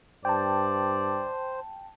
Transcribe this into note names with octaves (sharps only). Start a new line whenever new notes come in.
G2 C5 D5 G5 A5